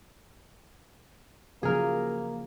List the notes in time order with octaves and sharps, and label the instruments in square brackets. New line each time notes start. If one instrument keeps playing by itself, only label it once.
[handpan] C#3 F3 F#3 [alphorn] A#3 [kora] G#4 A#4